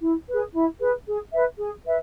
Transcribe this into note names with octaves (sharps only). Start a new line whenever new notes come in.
E4
G#4 B4
E4
G#4 B4
G#4
B4 E5
G#4
B4 E5